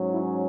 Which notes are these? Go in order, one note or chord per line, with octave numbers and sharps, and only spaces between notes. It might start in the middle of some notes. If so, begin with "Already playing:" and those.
Already playing: G#2 F#3 C#4
E4